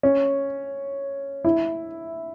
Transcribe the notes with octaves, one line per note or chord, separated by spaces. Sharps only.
C#4
E4